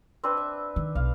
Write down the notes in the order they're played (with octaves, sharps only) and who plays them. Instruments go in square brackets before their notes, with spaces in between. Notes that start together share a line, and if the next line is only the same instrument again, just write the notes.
[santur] C4 D4 B4
E5
[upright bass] D#3
[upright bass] B1 [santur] F5